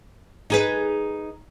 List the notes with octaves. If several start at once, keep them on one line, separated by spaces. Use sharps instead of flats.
D#4 G#4 B4